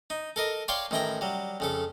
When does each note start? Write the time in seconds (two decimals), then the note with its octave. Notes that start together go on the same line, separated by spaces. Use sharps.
0.10 D#4
0.36 A4 A#4 D#5
0.68 C#5 D5 F5 G5 A5 C6
0.91 A1 D#3 E4 G5 A#5
1.21 F#3 G3
1.60 F2 C#3 A4